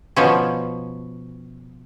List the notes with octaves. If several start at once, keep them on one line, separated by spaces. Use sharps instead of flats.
B2 F3 C#4